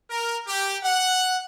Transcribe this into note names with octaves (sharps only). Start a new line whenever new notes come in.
A#4
G4
F#5